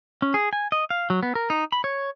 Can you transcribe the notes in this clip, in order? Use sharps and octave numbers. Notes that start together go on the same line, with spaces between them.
C#4
G#4
G#5
D#5
F5
F#3
B3
A#4
D#4
B5
C#5